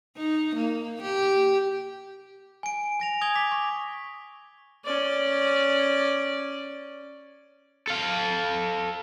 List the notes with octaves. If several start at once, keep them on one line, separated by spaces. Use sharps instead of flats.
D#4
A#3
G4
G#5 D7
G#5 A#6 F7
D#6 G#6 F7 G7
D6 B6
C#6
C#4 D5
A4 F5